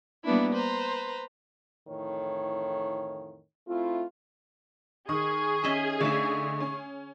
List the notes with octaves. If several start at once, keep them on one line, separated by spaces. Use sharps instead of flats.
G3 A#3 B3 D4 E4
B4 C5 A#5
F2 A2 D#3 E3 C#5
A3 C4 E4 F4
D#3 G#4 C#6 D#6
C#4 D#5 E5
D3 A3 D#4 E5 F5 C#6
C#4